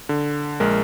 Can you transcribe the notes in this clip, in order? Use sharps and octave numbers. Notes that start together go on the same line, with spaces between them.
D3
A#1 G#3 A#4